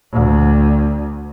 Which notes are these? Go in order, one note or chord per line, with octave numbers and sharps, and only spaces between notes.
D2